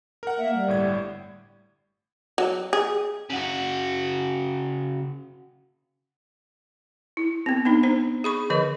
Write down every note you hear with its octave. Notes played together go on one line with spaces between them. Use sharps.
A#4 F#5
A#3 E5
G3
G1 A2 G#6
F#3
G#4
C#3 F#4
E4
B3 C4
B3 D4 D#4
D4 C5
G#4 B5 C#6
D3 F3 B4 D#5